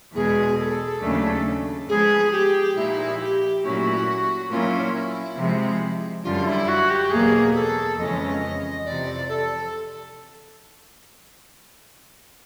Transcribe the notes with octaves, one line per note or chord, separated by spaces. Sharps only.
E2 B2 G#3 G#4
A4
D#2 C#3 F#3 A3 D4
G#2 F3 G#3 B3 G#4
G4
A#2 F3 A#3 D#4 E4
G4
A#2 F#3 A3 C#4 E4 F#4
A#2 F#3 A#3 C#4 E4 F4
E4
C3 F3 G#3
F#2 D3 G3 F4
E4
F#4
G4
E2 B2 F#3 A#3 G#4
A4
F2 C#3 E3 G#3 C#4 D#5
F2 C3 E3 D5
A4